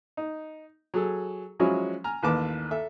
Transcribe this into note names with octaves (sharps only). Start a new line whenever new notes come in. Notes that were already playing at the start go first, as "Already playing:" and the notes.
D#4
F#3 G#4 A4
F3 F#3 G#3 C#4 E4 F#4
G#5 A#5 F6
A1 D#2 B4 A5 D6
A4 E5